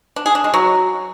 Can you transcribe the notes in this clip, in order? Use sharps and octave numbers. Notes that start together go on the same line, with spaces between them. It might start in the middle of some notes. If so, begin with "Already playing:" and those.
D4
G#4
D4
G#3
F#3